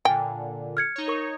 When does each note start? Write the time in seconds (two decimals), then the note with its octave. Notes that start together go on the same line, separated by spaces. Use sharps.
0.05 A#2 D3 G5 G#5
0.77 F6 G#6 C#7
0.96 D#4 C#5
1.08 A#4 C#6